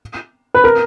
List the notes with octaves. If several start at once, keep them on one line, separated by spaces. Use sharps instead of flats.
B4
A#4